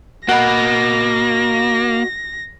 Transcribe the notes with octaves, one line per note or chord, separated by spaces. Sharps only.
A#3 F#4 D#5 F#5 B5 A#6